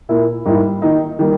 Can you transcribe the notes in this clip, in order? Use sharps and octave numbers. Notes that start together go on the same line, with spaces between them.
A#2 A#3 E4
G#2 G3 A#3 E4
D#3 A#3 D#4
D#3 G3 A#3